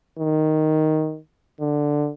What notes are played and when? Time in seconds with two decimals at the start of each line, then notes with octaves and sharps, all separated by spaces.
0.19 D#3
1.61 D3